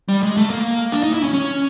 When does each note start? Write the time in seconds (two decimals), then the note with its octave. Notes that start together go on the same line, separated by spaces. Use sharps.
0.08 G3
0.23 G#3
0.37 A3
0.50 A#3
0.92 D4
1.03 D#4
1.14 E4
1.24 C#4
1.34 C#4